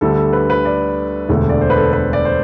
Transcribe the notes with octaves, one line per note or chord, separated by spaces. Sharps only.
D2 D3 G3 A4
B4
B4
D5
E1 D2 D3
D5
C5
B4
A4
B4
D5
C5